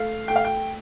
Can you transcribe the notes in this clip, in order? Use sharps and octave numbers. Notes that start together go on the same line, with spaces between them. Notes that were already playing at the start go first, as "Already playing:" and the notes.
Already playing: A3 F5
A3 G5
F5
G5